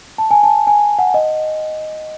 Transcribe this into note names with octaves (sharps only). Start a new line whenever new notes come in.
A5
G#5
A5
G#5
F#5
D#5